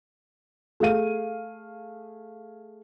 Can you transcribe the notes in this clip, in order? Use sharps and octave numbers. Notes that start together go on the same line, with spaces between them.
A3 G#4 F5 D#7